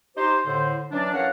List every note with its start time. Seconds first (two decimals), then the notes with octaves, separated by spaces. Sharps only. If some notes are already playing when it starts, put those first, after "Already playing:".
0.17 D#4 G4 C5
0.45 A2 D3 C5
0.91 E3 F#3 C#4 D4
1.13 E2 A#4 C#5 F5 F#5